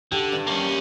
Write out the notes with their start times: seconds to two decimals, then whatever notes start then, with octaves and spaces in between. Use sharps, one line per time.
0.12 D3 G4
0.32 G2
0.47 A#3 C#4